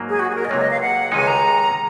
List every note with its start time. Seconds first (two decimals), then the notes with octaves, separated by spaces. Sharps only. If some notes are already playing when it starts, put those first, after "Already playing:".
Already playing: G#2 F#3 A#3
0.09 G#4
0.19 F#4
0.30 G#4
0.35 A#4
0.45 D#5
0.50 C#2 C3 F#3 A#3 C#5
0.61 D#5
0.70 F5
0.81 F#5
1.12 C#2 C3 D#3 G#3 D#4 G#5
1.27 A#5